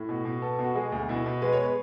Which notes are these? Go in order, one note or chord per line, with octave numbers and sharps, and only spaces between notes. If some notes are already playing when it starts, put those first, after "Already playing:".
Already playing: A2
B2
B2
B3 A4
B2
F#4
G#3 G#4
D2
B2 E4
B2
G#3 B4
C#5
B4